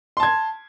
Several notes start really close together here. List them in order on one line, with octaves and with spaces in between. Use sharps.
C6 A5 G#6